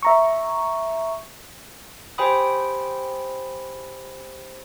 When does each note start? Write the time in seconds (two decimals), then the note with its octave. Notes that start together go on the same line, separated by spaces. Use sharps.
0.03 E5 A#5 C#6
2.18 G4 C5 G5 G#5 B5 D#6